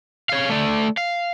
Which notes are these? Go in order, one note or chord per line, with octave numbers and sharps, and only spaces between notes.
C#5 F5
A3 D5
F5